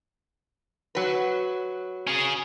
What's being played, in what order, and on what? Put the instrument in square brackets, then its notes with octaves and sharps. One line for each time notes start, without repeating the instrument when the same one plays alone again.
[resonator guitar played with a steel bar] F#3 B4
[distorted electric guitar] C#4 G#4